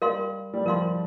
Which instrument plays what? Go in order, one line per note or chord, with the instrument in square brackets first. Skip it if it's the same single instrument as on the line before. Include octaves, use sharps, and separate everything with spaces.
[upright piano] G3 [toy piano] A#4 F5 C6
[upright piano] G3
[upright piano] F3 [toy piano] A#4 F5 C6